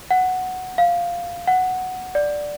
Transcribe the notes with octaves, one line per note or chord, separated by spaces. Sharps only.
F#5
F5
F#5
D5